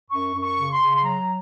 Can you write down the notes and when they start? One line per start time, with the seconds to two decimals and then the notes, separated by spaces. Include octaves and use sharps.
0.11 F#2 C#6
0.34 F#2
0.41 C#6
0.57 C#3
0.72 C6
0.80 C#3
0.96 C6
1.03 F#3 A#5